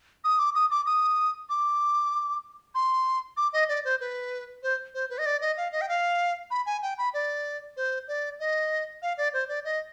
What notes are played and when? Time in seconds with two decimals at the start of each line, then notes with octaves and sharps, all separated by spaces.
0.24 D#6
0.39 D6
0.55 D#6
0.71 D6
0.86 D#6
1.50 D6
2.75 C6
3.37 D6
3.53 D#5
3.69 D5
3.85 C5
4.00 B4
4.63 C5
4.94 C5
5.10 B4
5.18 D#5
5.26 D5
5.41 D#5
5.57 F5
5.72 D#5
5.81 G5
5.89 F5
6.51 B5
6.66 G#5
6.83 G5
6.98 B5
7.14 D5
7.77 C5
8.08 D5
8.40 D#5
9.02 F5
9.18 D5
9.33 C5
9.49 D5
9.65 D#5